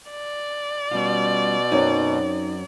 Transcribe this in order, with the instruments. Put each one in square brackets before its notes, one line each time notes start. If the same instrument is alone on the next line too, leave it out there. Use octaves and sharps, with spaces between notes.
[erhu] D5
[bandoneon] B2 [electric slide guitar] G3 C#4 F4
[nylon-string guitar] F#2 F#3 C4 [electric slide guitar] D#4 F#5